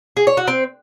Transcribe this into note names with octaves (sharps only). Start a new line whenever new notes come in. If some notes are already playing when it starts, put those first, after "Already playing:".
G#4
C#5
F#4
C4